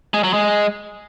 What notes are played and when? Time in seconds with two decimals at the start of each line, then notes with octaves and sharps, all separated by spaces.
0.14 G#3
0.24 F#3
0.33 G#3